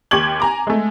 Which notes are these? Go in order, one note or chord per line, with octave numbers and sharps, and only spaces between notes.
D#2 G4 C#6 D6 G#6 F#7
G#5 A#5 D6
G#3 A3